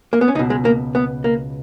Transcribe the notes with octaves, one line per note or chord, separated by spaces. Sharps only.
A#3
B3
C#4
C#2 B2 D#4
G#3
A#3
B3
A#3